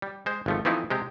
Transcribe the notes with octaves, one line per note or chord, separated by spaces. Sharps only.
G3
G#3 C5
G#1 F3 A3
E3 F3 A3 C4 D#4 E4
C3 G#3 G4